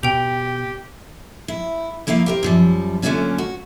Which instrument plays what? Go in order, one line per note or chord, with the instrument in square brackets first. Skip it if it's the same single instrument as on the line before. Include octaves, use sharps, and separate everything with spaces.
[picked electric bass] B2 [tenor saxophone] G4 [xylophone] G5 F7
[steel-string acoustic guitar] E4
F3 A#3 E4 A#4 F5
G4 A#4 C5
F#2 F3 G3
F#2 D3 A3 A#3 C#4 F4
F#4